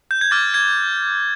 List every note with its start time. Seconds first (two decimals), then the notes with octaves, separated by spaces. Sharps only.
0.11 G6
0.21 G#6
0.31 D6 F6 A6
0.54 G#6